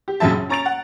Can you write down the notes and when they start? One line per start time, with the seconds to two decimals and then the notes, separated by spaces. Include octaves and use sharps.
0.08 G4
0.20 A#1 F#2 C#3 F#3 E5 A5
0.32 C#3
0.49 C#4 A#5 C#6 A6 D7 F7
0.66 F#5